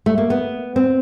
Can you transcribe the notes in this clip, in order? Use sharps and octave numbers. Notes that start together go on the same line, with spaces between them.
A3
A#3
B3
C4